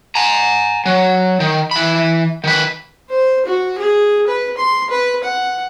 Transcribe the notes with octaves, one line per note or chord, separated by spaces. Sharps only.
G#5 A#5
F#3
D#3
E3 B5
D#3 B4
C5
F#4
G#4
B4
C6
B4
F#5